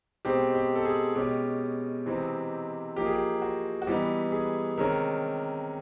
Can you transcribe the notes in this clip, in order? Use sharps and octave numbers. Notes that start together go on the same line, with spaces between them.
B2 G#3 C4 D#4 G4
G4
A4
G#4
B2 G#3 C#4 G4
C3 E3 G#3 C4 D#4
F3 A#3 D#4 G4
G#4
G4
F#4
F#4
E3 G3 B3 D#4 G4
G#4
C3 D#3 G#3 C#4 A#4